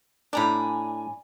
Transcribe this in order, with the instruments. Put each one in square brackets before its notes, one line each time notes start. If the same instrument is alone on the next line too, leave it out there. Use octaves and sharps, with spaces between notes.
[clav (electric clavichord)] A2 D4 [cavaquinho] D5 A#5 B5 [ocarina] G#5